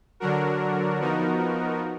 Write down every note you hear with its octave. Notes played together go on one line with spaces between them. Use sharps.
D3 F#3 D4 F#4 A#4
F3 B3 D#4 F#4 A#4